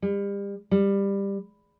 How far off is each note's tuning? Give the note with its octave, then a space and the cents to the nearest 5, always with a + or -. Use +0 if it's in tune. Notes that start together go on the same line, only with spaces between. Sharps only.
G3 +35
G3 +15